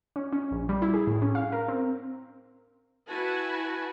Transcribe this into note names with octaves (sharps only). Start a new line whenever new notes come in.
C#4
C#4
A#1
G3
E4
G#4
A2
C#4
F5
A#4
C4
E4 F#4 B4 G#5 A5